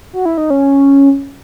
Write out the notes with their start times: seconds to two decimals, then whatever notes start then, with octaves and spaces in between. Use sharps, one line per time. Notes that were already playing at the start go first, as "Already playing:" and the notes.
0.13 F#4
0.25 E4
0.38 D#4
0.50 C#4